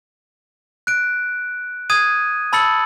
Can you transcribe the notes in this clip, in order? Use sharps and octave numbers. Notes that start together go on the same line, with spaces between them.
F#6 D7
D#6 G#6 D#7
A5 B5 E6 A6 C#7 F#7